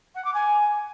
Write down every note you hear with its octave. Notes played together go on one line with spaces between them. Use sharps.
F#5
D6
G#5